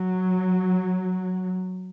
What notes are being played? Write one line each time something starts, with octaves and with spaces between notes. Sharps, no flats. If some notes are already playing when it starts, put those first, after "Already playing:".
Already playing: F#3